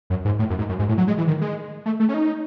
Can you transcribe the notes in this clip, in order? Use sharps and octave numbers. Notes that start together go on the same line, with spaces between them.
F#2
G#2
A2
F#2
G#2
F#2
G#2
A2
F#3
G#3
E3
D#3
G#3
A3
A3
C#4
D#4